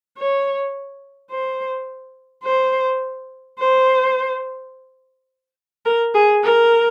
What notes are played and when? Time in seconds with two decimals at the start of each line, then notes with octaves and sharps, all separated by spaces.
0.18 C#5
1.31 C5
2.44 C5
3.59 C5
5.86 A#4
6.15 G#4
6.43 A#4